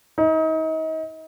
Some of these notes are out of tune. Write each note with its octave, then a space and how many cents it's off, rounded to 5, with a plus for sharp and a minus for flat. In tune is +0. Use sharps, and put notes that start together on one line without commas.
D#4 +35